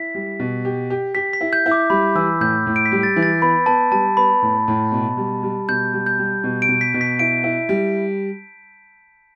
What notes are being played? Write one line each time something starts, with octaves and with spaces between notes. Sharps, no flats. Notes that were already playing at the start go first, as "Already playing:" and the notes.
Already playing: E4 B6
G3
B2
G4
G4
G4 B6
B6
E4
G6
E4
D6
G3 B5
E3 E6
A2 G6
A2
D7
B6
G3
A6
E3
A6
B3 B5
B3 A5
G3 A5
B3 B5
A2
A2
B2
G3
G3
B2 G6
G3
G6
G3
B2
D7
B2
B6
B2
B6
E4 D7
E4
G3